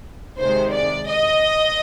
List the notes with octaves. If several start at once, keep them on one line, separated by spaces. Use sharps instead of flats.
C3 D#3 G#3 C5
D5
D#5